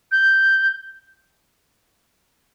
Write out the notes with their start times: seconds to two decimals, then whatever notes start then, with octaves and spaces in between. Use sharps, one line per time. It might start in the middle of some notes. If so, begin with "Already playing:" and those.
0.12 G6